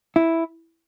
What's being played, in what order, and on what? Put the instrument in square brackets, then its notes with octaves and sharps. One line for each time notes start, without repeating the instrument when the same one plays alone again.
[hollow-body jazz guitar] E4